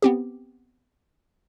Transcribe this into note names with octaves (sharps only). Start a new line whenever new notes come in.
B3 C4 G4